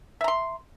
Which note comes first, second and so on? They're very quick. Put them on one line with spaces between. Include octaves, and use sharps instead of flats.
E5 A#5 C6